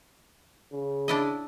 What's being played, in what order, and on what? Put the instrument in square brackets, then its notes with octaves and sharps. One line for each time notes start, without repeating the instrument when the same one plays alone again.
[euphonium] C#3
[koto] D4 E4 D#5